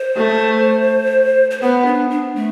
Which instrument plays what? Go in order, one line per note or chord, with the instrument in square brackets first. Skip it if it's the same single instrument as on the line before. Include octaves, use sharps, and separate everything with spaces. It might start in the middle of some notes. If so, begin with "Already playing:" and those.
Already playing: [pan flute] C5
[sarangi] A3
[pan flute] C5
[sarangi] B3 [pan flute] B4
[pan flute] D4
D4
A3